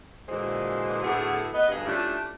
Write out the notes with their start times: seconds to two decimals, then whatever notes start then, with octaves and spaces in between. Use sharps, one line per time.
0.29 A#2 D3 E3 G#3 F#4 C5
1.04 A2 D3 A3 B3 F#4 G#4
1.53 B3 D#5
1.69 D2 G2 G#4
1.86 A3 C#4 D4 E4 F4 G4